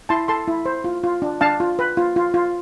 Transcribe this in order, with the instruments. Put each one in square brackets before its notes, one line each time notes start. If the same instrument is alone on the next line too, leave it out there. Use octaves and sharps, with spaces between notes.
[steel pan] E4 A5 C6
A4 A5 C6
E4
C5
F4
F4
D4
D4 F5 A5
F4
B4
F4
F4
F4